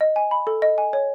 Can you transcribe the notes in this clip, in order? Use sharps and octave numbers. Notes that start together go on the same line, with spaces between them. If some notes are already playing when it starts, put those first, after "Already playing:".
D#5
G#5
B5
A4
D#5
G#5
C#5